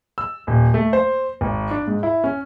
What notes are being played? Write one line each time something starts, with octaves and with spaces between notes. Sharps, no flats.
E6
D#1
A3
C5
G#1
D4
G#2
E4
C#4